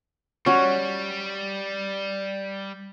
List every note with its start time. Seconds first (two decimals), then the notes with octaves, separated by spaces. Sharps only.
0.46 G3 C#4 F#4